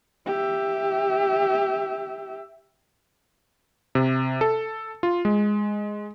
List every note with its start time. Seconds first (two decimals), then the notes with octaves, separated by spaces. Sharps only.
0.26 G4 E5
3.95 C3
4.41 A4
5.03 F4
5.25 G#3